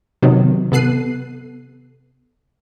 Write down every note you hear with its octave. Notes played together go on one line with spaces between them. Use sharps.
C3 D#3 F#3 B3
C3 B3 A4 F#6 C7 D#7